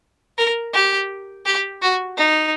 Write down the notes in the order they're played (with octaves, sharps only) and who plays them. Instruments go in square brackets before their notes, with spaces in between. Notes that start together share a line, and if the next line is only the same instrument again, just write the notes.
[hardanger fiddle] A#4
G4
G4
F#4
D#4